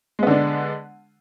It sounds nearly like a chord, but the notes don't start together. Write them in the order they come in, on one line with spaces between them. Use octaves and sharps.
G#3 B3 D3 D4